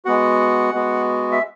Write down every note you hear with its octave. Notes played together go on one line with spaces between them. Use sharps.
G#3 B3 F#4 F#5
G#3 B3 F#4
E5